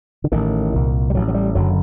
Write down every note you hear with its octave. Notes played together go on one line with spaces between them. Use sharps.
D3
A1 A2 D#3
C2 A#2
G3
A1 A2 F#3
F#3
G3
F#1 F#2 D3 F#3